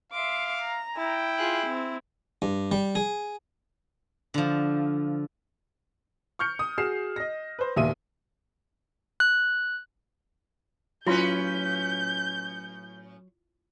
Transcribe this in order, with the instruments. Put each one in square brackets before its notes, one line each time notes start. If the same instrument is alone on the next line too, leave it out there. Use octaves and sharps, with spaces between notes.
[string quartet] E5 C6 D6 [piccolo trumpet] F5
[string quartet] A#5
[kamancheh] E4 [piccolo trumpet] G5
[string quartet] F4 G#4 F#6
C4
[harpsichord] G2
G3
G#4
[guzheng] D3 F3
[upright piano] C#6 F6 G6 C#7
D#6
F#4 G#4 F6 C7 E7
D#5 A#6
B4 C5
E1 D#2 A#2 E5 D#6 D#7
[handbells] F#6
[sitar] A2 C#4 B4 [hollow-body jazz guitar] F#3 [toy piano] E4 F4 C6 [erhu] G6